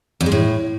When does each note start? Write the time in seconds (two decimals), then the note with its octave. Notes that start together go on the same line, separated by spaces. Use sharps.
0.21 F2
0.26 G#3
0.32 A2